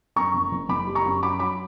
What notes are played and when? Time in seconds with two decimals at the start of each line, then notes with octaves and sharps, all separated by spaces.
0.16 F#2 A#5 C#6
0.34 F#1
0.52 F#1
0.69 F#1 B5 D6
0.87 G3
0.95 A#5 C#6
1.05 F#2
1.22 F#3 B5 D6
1.39 F#3 B5 D6